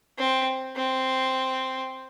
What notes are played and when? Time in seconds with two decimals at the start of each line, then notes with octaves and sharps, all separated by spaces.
0.18 C4
0.76 C4